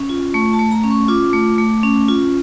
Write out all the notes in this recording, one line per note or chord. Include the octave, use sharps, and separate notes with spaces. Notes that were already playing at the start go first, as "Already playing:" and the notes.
Already playing: C#4
F4
A3 C#6
A5
A3
A#5
C#4
C#6
F4 D6
A3
A3
C#4
F4